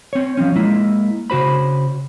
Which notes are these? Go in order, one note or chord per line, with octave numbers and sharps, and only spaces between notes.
C4 C#5
F3 C4 C#4
G#3 A#3 E4
C#3 F#4 C5 B5